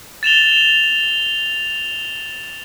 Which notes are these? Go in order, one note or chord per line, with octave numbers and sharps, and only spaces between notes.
A6 E7 F7 G7